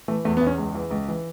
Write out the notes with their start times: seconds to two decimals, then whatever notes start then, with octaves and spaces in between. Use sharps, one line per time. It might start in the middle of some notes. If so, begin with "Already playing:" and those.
0.08 E3 A3
0.25 E2 A3
0.37 B3
0.41 E2
0.47 C#4
0.58 C#2
0.75 E3
0.91 C#2
1.08 E3